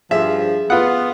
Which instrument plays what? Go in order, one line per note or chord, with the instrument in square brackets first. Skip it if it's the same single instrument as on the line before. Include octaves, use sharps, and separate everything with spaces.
[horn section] G2 F3 [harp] G#4 [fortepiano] E5
[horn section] B3 [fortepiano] F4 F#5